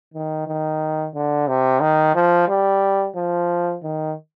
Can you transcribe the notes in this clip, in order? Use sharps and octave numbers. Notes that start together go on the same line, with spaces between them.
D#3
D#3
D3
C3
D#3
F3
G3
F3
D#3